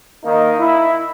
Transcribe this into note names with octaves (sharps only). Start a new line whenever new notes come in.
D#3 A#3 D#4
E4